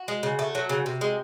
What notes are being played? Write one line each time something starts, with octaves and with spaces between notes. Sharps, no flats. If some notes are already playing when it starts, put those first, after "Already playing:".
Already playing: F#4
G#3
C#3
A3
F#3
C#3
C3
G#3